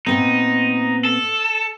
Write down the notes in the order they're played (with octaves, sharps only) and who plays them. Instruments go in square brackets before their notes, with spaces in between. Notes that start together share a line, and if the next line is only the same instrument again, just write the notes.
[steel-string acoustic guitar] A#2 B3 C4 [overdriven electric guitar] D#4
[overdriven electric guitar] A4